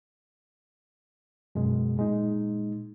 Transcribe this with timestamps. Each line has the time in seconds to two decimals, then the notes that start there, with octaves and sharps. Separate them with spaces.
1.55 F#2 B2 G#3
1.97 A#2 G#3 D#4